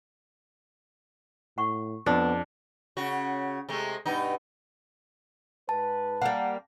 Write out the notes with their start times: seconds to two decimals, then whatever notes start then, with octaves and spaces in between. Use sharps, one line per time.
1.58 A2 F#5 C#6
2.06 F2 B3 D4
2.97 C#3 F#4
3.69 C3 G#3 A3
4.06 G2 B2 D#4
5.69 G#2 B4 A5
6.22 G3 A#3 F#5